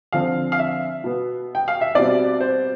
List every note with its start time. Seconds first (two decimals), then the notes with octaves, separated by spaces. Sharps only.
0.12 D3 F3 C4 F5
0.52 F5
0.59 E5
1.04 B2 B3
1.55 G5
1.68 F5
1.81 E5
1.95 B2 G3 C4 D5
2.40 C5